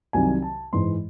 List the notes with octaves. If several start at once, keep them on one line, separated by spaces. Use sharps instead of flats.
C2 C3 D#3 F#3 G#5
A5
G#2 E3 G#3 C6